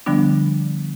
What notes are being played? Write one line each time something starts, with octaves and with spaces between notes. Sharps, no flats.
D3 F3 G3 B3 D4